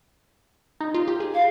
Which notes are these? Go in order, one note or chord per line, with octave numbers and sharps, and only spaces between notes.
D#4
F4
G4
G#4
F5